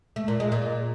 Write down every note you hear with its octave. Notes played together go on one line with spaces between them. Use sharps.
A3
A#2
G#3
A#2